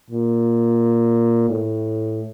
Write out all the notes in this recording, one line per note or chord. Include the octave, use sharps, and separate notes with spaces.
A#2
A2